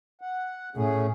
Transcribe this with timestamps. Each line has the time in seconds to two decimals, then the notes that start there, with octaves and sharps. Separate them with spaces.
0.21 F#5
0.75 A2 A3 C#4 G#4